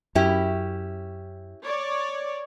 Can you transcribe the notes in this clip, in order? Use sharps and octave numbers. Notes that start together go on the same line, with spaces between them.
F#2 C#4 E4 G4
C#5 D5